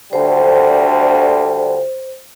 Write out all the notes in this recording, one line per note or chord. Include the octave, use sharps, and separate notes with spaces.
D2 D3 G3 C5